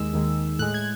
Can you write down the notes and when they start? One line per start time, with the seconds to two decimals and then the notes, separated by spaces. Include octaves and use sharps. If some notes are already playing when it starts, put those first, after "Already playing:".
Already playing: D#2 D#3 G#3 E6
0.13 D#2 D#3 G#3
0.59 A2 G#3 F#6
0.74 G#6